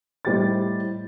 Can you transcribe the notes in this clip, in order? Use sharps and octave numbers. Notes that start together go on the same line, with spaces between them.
A2 G3 G4 C5 D#5 A6